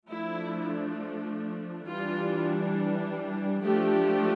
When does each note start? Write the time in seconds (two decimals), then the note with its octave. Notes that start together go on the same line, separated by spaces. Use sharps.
0.10 F3 A3 D4 E4
1.87 E3 G3 D4 F4
3.63 F3 A3 D4 G4